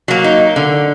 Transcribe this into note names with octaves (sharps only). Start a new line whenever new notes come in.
F#3 A#3
D#4
D3